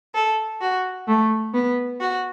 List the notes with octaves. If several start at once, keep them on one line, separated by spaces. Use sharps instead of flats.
A4
F#4
A3
B3
F#4